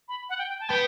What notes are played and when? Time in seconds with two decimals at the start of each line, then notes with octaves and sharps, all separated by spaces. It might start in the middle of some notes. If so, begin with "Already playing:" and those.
0.08 B5
0.29 F#5
0.39 G5
0.49 G5
0.60 A5
0.69 B3 G5